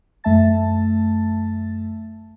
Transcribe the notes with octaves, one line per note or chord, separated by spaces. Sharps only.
F#2 A3 E5 A5 A6